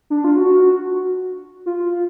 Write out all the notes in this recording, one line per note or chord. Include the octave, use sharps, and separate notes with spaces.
D4
F4
F#4
F4